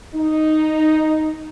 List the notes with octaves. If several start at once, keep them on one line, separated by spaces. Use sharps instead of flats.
D#4